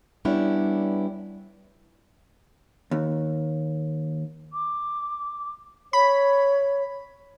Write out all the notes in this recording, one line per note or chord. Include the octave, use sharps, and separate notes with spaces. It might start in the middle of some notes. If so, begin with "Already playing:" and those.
G3 B3 C#4 D4 E4
D#2
D6
C#5 B5